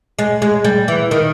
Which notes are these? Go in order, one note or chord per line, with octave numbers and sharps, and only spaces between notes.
G#3
G#3
G3
E3
D#3